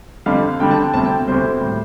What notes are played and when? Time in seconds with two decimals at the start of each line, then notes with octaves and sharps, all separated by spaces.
0.26 F2 D3 G3 F5
0.59 F2 D3 G3 G5
0.71 A5
0.82 G5
0.93 D2 C3 G3 A5
1.05 G5
1.27 D2 C3 G3 C5
1.61 A2 G3